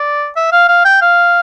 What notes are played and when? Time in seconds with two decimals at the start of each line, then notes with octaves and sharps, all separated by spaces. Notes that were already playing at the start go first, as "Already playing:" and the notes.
Already playing: D5
0.36 E5
0.52 F5
0.69 F5
0.85 G5
1.02 F5